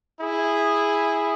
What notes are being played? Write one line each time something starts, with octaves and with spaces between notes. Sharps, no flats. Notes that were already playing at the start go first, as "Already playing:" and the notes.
E4 G#4